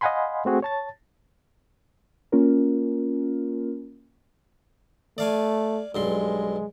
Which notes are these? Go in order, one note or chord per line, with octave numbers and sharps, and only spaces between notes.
D#5 F5 F#5 G#5 B5 C6
A3 C4 F#4 G#4
C#5 A5 A6
A#3 C#4 F4 A#4
A3 D5 F5 G#5
B1 G2 G#3 C6